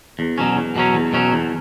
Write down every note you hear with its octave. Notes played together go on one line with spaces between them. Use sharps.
E2
B2 F#3 C#4
E2
B2 F#3 C#4
E2
B2 F#3 C#4
E2